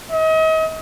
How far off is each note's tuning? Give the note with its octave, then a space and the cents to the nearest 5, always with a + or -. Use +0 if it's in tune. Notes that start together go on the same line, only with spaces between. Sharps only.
D#5 +35